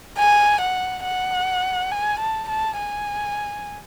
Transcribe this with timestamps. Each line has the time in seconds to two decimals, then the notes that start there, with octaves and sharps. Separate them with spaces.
0.19 G#5
0.61 F#5
1.05 F#5
1.92 G#5
2.20 A5
2.49 A5
2.78 G#5